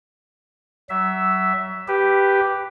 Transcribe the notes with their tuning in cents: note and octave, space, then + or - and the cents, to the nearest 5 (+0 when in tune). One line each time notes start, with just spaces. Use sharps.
F#3 +25 E5 +0
G4 +0 B4 +0